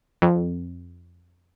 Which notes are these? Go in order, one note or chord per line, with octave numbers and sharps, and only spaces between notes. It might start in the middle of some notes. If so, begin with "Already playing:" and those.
F2